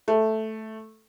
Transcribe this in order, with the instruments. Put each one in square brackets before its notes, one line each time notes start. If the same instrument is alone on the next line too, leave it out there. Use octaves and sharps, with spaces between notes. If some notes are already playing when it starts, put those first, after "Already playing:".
[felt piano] A3